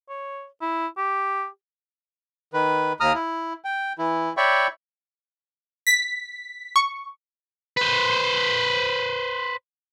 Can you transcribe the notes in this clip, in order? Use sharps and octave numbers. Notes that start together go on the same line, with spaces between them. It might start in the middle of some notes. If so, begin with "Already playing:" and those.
C#5
E4
G4
D#3 B4
D#2 A#5 D#6 F6
E4
G5
E3 E4
C#5 D5 E5 G5 B5 C#6
B6
C#6
B4 C5